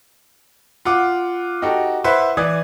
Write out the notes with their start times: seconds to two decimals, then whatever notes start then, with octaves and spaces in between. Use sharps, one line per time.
0.85 F4 F#5 D6
1.62 D#4 F#4 G4 A4
2.04 E4 B4 C5 E5 F#5
2.37 E3 D5 D#6 G#6